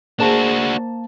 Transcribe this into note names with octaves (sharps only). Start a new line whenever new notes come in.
A#3 D4 F#4 G#4 C5 A5